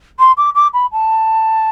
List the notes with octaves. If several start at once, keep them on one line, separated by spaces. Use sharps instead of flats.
C6
D6
D6
B5
A5